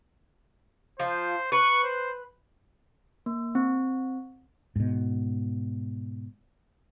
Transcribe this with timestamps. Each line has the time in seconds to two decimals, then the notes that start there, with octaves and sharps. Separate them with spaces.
1.00 F3 C5
1.52 B4 C#6
1.84 C5
3.26 A#3
3.55 C4
4.76 G#2 B2